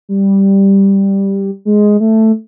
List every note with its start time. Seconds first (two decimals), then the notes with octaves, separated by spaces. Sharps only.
0.09 G3
1.65 G#3
2.00 A3